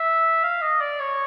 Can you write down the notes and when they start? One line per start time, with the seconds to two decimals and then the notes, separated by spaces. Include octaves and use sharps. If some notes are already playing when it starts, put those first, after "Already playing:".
Already playing: E5
0.43 F5
0.62 D#5
0.81 D5
1.00 C#5